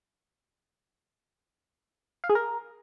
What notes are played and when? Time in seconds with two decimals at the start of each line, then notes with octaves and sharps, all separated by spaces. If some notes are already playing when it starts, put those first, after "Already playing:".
2.24 F5
2.29 G#4
2.35 A#4